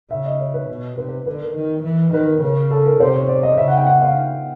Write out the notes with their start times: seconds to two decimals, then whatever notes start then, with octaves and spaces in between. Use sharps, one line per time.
0.11 C#3 E5
0.25 D#5
0.40 C#5
0.54 B4
0.69 B2
0.98 C3 B4
1.08 B4
1.26 D3 B4
1.41 A#4
1.56 D#3
1.84 E3
2.13 D#3 B4
2.28 A#4
2.42 C#3 A#4
2.71 A4
2.86 A#4
3.00 C3 C5
3.15 C#5
3.28 D5
3.43 D#5
3.58 C#3 E5
3.68 F#5
3.77 G5
3.87 F#5
4.02 F5